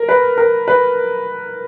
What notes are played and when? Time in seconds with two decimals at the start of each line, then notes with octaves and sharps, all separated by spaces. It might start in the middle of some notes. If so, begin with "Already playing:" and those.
Already playing: A#4
0.09 B4
0.38 A#4
0.68 B4